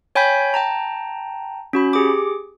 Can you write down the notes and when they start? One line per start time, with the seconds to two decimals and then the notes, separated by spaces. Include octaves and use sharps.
0.15 C#5 G5 G#5 B5 G6 B6
0.54 G5 A5 A#5
1.73 C#4 F#4 B5
1.93 G4 G#4 D6